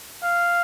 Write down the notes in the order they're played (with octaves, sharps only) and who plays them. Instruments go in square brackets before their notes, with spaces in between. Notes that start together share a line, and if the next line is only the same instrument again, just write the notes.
[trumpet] F5